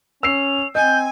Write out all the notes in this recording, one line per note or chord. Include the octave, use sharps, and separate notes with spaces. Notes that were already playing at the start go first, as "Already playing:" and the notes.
C#4 E6 C7 F7
C4 D#5 G#5 G6